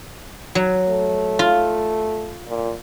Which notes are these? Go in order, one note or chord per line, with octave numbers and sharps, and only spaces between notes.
F#3
A3
F4
A#2